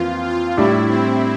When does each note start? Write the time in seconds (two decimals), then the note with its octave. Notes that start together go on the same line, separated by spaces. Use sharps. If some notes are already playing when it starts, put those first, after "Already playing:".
Already playing: F2 E3 A#3 F4
0.27 F4
0.57 A2 G3 D4 E4 G4
0.89 C4